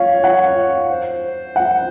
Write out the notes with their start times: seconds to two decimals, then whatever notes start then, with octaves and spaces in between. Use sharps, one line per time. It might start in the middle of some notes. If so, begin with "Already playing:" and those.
Already playing: C#5 F5
0.24 F#5
0.90 C5
1.56 F#5